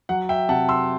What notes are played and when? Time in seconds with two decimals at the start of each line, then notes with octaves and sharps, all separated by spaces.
0.09 F#3 F#5
0.29 E5 G5
0.49 C3 F#5 A5
0.69 C6 E6